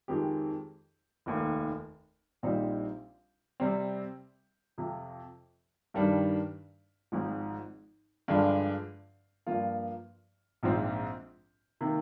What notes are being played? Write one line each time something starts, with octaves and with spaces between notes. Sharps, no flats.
F2 D#3 G#3 C4 G4
F1 D#2 D#3
A#1 A#2 G3 C4 D#4
C3 G3 C4
F2 C3 F3
G2 D#3 G3 D4
G#1 G#2 F3 C4
G2 D3 F3 G#3 D4
G2 F3 A#3 F4
A#1 G#2 F3 C4
C3 D#3 A#3